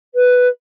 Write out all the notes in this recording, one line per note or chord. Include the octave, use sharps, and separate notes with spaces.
B4